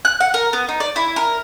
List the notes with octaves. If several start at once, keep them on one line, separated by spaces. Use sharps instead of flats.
F#6
F#5
A#4
B3
D#4
D5
E4
A#4